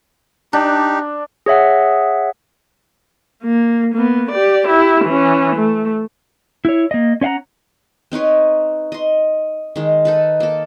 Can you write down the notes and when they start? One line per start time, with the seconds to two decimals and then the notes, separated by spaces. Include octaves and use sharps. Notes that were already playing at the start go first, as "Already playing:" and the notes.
0.53 D4 D#4 G4
1.46 G#4 C#5 E5 F#5
3.44 A#3
3.94 A#3 B3
4.31 G4 D5
4.66 E4 G4
5.05 E3 C#4
5.56 A3
6.65 E4 C#5
6.91 A#3 D#5
7.21 C#4 C#5 F5 F#5 A#5
8.12 C4 D#4 B4 C#5
8.92 D#5 C6
9.76 D#3 G#3
10.05 D#4 A4 B4
10.40 A#3 A4